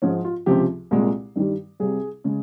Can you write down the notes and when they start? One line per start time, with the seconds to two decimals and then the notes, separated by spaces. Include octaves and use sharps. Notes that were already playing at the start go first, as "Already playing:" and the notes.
0.02 G#2 F3 G#3 C#4
0.24 F4
0.46 C#2 C3 F3 G4
0.91 C2 A#2 G#3
1.36 G2 D#3 G3
1.80 C2 C3 G3 G#4
2.24 C#3 G#3